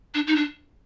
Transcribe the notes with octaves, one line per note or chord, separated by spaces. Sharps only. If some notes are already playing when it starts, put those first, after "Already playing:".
D4
D#4
D4